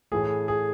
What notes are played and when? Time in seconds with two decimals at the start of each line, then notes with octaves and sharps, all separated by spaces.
0.12 A2 E3 A3 G#4
0.48 G#4